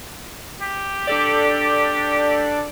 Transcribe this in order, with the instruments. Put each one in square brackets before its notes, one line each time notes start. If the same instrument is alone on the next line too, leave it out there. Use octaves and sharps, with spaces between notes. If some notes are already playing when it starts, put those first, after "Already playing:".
[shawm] G4
[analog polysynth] D4 A4 D5